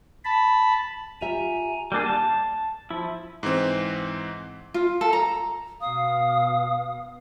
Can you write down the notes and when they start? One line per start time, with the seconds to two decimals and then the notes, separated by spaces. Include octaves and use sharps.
0.25 A5 B5
1.21 F4 G4 E5 G#5 A#5
1.92 G3 A#3 D4 G#4
2.06 A5
2.90 F3 E4
3.43 G#2 E3 C4
4.74 F4
5.01 A4
5.13 A#5
5.81 B2 F5 D#6